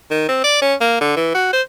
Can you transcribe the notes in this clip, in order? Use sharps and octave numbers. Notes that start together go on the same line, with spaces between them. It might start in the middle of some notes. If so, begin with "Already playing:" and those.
D#3
C4
D5
C#4
A#3
D3
E3
F#4
C5